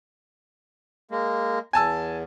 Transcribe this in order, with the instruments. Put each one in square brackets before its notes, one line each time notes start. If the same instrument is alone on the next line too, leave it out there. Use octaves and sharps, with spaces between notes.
[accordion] G#3 A#3
[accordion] E2 [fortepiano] G#5 A5 E6